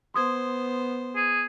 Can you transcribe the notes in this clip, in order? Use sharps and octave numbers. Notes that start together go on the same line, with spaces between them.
B3 C5 C6 D#6 G#6
G#4